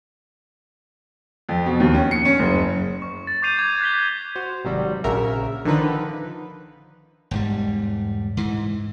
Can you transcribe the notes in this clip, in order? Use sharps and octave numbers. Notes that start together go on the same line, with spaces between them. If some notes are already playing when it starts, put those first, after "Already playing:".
F2
B2
D#2
C#4
C#7
C#4
F#1
C#6
A6
C#6 D6 G6 C7 D#7 F7
D6 G#6
F#6 G6 A6 B6 F7 G7
F#4 C5
G#1 C3 F#3 G3
A#1 C#3 F#4 A#4 E5
D3 D#3 F3 D#4 B4
E1 G#2 G3
G#2 E3